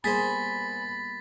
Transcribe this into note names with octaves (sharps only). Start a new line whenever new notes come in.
G3 A#3 B3 G#4 C5 B5 A6 B6